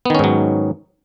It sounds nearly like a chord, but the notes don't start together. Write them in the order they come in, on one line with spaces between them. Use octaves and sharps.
B3 D#3 C#4 G#2 F#3